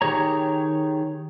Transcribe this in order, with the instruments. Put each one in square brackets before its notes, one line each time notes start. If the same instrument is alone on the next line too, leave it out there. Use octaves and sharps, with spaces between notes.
[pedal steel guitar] D#3 G4 G#4 C#5 A#5